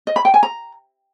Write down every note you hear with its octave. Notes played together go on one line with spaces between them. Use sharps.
D#5
B5
G5
G#5
A#5